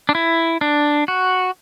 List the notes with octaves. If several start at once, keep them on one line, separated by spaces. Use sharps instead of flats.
D4
E4
D4
F#4